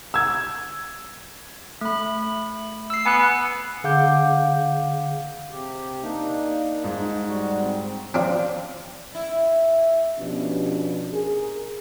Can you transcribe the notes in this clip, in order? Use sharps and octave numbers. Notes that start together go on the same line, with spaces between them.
E6 G#6
A3 B5
E6 C7
B3 G#5 F#6
D3 G#4 F5 F#5 D6 G6
C3 G4
A#3 D4 D#4
G#2
G3 F#4
C4
C4 D4 F4
E4
B2 F3 B3 C#4 D4 G4
G#4 A#4